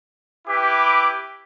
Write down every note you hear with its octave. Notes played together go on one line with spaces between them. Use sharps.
E4 G4 B4 D6